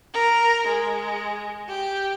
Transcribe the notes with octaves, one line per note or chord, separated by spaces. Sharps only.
A#4
G#3
G4